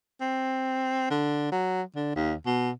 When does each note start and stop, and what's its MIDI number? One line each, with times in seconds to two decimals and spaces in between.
0.21 1.10 60
1.10 1.50 50
1.52 1.82 54
1.96 2.13 50
2.16 2.34 39
2.46 2.71 47